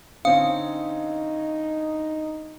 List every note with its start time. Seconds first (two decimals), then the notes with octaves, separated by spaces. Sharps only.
0.25 D3 C4 C#4 D#4 F5 D#6